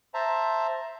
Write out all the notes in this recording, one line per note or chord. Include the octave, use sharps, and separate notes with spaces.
C5 E5 A5 A#5